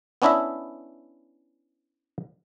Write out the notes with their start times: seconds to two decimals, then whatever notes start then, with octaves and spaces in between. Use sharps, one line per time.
0.22 B3 C#4 D4 E4 D#5 E5